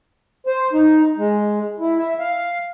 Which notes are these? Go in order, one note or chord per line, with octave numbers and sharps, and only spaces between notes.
C5
D#4
G#3
E4
E5
F5